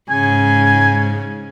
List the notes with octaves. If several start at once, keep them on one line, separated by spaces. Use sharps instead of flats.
G#2 C#3 G#5